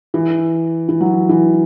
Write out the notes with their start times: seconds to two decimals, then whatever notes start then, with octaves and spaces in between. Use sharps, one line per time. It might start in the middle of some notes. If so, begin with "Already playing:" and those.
0.14 E3
0.89 E3
1.01 F#3
1.29 E3